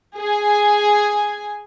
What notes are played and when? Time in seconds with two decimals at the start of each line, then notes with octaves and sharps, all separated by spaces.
0.17 G#4 G#5